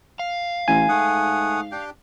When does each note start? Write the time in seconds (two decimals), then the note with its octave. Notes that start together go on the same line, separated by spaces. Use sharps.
0.19 F5
0.68 A1 G#5
0.89 G#2 A3 F#5 D#6
1.72 D4 G4 G5